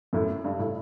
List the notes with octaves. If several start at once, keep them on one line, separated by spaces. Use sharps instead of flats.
F#2 A2
G2
A2